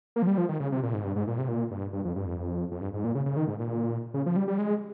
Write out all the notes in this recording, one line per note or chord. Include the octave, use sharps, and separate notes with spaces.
A#3
F3
G3
F3
D#3
C#3
C3
A#2
G#2
G2
G#2
A#2
C3
A#2
G2
G2
F2
G2
F2
F2
G2
G#2
A#2
C#3
C#3
D#3
G#2
A#2
C#3
F3
G3
G3
G#3